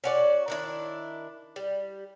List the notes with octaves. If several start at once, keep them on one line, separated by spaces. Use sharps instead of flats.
C#4 F#4 D5
D#3 D4 E4
G3